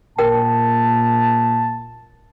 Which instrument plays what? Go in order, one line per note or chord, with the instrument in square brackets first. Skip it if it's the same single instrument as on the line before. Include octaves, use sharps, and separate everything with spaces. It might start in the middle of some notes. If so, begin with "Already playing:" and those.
[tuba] A#2 [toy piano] A#4 G5 [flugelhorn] A5